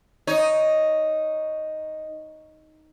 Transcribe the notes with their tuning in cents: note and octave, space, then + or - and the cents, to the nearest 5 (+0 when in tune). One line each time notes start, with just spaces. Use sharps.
D#4 +0 C#5 +0